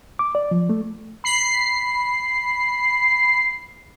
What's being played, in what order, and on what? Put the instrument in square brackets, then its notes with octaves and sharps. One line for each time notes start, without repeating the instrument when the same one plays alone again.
[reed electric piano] D6
D5
F3
A3
[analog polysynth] B5 C7